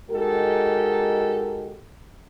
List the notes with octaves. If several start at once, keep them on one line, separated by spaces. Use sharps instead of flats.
G#3 D#4 F#4 G4 A4 A#4